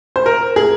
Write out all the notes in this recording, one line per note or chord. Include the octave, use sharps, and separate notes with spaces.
C5
A#4
G#4